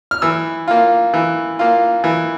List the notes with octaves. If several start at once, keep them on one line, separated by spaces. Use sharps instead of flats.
F6
E3 E6
A#3 F4
E3
A#3 F4
E3